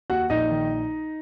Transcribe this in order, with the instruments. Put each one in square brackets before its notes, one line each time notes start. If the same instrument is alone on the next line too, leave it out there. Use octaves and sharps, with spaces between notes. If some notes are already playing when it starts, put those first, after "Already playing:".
[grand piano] D#2 F#4 F#5
A#1 D#4 D#5
D#3